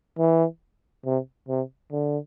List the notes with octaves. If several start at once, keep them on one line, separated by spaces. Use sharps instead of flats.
E3
C3
C3
D3